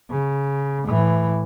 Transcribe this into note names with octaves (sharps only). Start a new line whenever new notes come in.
C#3
A2 E3